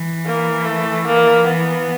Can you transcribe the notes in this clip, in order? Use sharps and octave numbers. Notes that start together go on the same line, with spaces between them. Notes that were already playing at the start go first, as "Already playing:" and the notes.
Already playing: E3
A#3
A3
A#3
E3 B3